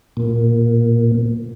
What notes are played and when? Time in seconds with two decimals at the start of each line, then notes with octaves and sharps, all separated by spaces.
0.17 A#2